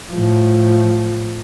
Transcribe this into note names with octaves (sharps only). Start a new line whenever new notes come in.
A2 F3